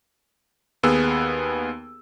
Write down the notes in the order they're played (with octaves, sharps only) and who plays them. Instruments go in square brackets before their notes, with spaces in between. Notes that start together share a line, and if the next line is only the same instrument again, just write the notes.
[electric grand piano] D#2 B3 G#4 E6